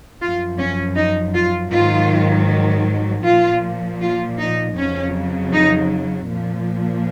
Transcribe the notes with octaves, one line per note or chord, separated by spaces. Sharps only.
F#2 F3 F4
C#4
D#4
F4
G#2 D#3 F#3 F4
A#2 F3 F4
F4
D#4
F2 C#3 F#3 C#4
D#4
A#2 F3